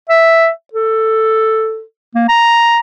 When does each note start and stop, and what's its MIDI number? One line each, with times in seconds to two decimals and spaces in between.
0.10 0.49 76
0.74 1.82 69
2.15 2.24 58
2.29 2.79 82